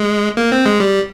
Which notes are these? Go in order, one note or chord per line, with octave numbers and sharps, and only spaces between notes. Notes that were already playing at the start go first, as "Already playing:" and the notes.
Already playing: G#3
A#3
C4
G#3
G3